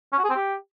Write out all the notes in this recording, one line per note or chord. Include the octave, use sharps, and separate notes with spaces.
C#4
F#4
G#4
C4
G4